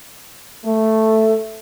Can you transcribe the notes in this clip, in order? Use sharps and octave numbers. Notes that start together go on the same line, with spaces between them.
A3